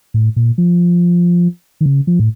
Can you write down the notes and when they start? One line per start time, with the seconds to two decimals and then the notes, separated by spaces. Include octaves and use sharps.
0.14 A2
0.36 A#2
0.58 F3
1.81 D#3
1.86 C#3
2.07 F3
2.19 A2